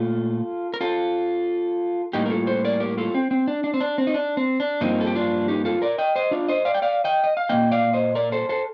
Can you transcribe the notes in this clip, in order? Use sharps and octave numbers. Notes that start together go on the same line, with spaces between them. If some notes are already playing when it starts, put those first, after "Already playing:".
Already playing: A#2 A3 F4 A4
A#4
F4 A4
A2 G3 A#3 D#4 G4
A#4
F4 A4
A4 C5
A#4 D5
G4 A#4
F4 A4
C4
C4
D4
D4
C4
D4
C4
D#4
D4
C4
D4
G2 F3 A#3 C4 D#4
A4
G4
D4 F4
D#4 G4
F4 A4
A#4 D5
D#5 G5
C5 D#5
D4 F4
C5 D#5
D5 F5
G5
D5 F5
D#5 G5
D#5
F5
A#2 G3 A#3 D#5 G5
D5 F5
C5 D#5
A#4 D5
A4 C5
A4 C5